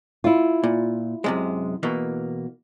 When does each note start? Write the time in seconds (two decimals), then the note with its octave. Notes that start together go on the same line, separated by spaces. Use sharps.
0.24 E4 F4
0.64 A#2
1.24 F#2 C3 G#3
1.83 B2 E3 A#3